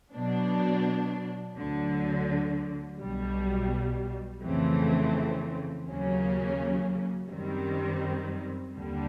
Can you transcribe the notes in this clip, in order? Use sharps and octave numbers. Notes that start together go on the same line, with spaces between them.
B2 F#3 B3 D4
D2 D3 F#3
B1 B2 G3
F2 C#3 E3 A3 C4
D#2 C#3 F#3 A#3 C#4
F#2 D#3 G3 C4
D#2 D3 G3